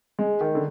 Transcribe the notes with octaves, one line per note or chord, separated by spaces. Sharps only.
G#3
D#3
D3